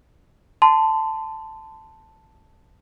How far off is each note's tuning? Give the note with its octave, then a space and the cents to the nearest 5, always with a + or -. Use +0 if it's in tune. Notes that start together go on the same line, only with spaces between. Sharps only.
A5 +0 C6 -25